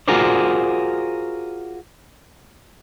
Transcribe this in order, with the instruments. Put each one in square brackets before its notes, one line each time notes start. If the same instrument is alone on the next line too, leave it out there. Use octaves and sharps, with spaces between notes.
[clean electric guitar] F4 F#4 G#4 A#4 C5 D5